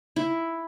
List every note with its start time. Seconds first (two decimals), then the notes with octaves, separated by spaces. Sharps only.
0.16 E4